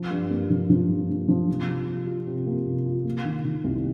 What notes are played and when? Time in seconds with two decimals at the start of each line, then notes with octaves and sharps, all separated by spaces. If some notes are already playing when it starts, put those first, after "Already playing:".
Already playing: F3
0.11 G2
0.31 A#3
0.50 F3
0.70 F3
0.89 G2
1.09 A#3
1.28 F3
1.48 C3
1.68 G3
1.88 G3
2.07 F4
2.27 C3
2.46 A#3
2.66 C3
2.86 F4
3.05 A#3
3.25 D#3
3.44 D#3
3.64 C2